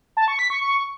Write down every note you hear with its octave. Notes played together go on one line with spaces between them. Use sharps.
A5
C#6
B6
C#6
C#6